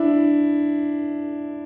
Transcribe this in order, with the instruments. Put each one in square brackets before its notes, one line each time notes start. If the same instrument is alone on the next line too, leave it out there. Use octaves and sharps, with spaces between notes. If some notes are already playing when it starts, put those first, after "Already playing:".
Already playing: [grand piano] D4 E4